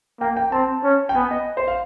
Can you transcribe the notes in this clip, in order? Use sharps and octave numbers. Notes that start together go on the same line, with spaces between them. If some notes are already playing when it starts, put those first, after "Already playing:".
A#3 G5
G5
C4 A5
C#4
G5
B3 G#5
D#5
C5
F5